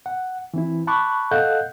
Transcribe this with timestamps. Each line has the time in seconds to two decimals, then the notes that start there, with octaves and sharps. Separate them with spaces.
0.06 F#5
0.54 E3 C4 E4
0.87 A5 B5 C#6 D6 F#6
1.31 A4 D#5 F5 F#5 F#6 G6